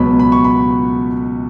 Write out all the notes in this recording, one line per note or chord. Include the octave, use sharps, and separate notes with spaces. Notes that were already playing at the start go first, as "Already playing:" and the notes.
Already playing: C#2 B2 F#3 B3 B5
B5
C#6
B5